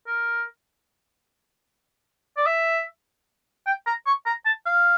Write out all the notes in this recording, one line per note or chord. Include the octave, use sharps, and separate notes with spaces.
A#4
D5
E5
G5
A#5
C#6
A#5
A5
F5